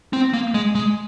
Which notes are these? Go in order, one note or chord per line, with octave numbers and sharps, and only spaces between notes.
C4
A#3
G#3
G#3